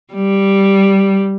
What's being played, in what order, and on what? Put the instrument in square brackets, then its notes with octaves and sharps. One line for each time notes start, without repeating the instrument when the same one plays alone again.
[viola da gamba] G3